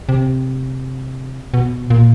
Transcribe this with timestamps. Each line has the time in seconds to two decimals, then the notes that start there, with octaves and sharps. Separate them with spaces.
0.09 C3
1.54 B2
1.90 A#2